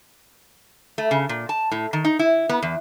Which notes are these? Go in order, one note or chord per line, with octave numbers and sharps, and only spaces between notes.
A3
C#3
A#2
A5
A2
D#3
D#4
E4
B3
E2